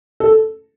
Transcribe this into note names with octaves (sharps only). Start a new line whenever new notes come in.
A4